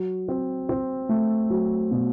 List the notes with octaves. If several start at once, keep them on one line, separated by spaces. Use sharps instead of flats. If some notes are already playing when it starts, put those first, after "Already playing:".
Already playing: F#3
C4
C4
A3
F#3
B2